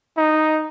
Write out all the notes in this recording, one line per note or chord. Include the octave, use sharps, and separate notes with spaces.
D#4